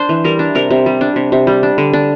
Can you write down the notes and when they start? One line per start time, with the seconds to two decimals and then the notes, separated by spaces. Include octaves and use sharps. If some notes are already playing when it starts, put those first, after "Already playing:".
Already playing: D4 C5
0.09 E3
0.25 G3 A#4
0.39 D4
0.55 C3 A#4
0.71 C3
0.86 G3
1.01 D4
1.16 C3
1.32 C3
1.47 G3
1.63 D4
1.78 D3
1.93 D4